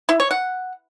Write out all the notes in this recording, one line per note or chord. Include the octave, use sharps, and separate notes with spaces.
E4
C#5
F#5